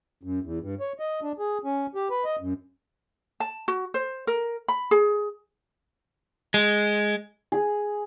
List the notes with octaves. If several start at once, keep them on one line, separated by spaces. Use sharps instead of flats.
F#2
E2
G2
C#5
D#5
D4
G#4
C#4
G4
B4
D#5
F#2
A5
F#4
C5
A#4
B5
G#4
G#3
G#4